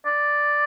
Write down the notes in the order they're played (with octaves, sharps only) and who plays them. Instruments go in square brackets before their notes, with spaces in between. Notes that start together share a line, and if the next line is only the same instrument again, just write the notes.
[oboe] D5